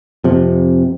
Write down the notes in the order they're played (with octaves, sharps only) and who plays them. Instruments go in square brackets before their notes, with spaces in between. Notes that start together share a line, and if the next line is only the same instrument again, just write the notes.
[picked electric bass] F2 C3